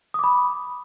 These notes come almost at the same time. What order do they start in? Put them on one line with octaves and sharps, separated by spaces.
D#6 D6 B5